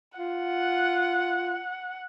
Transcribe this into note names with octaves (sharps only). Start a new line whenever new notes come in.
F4 F#5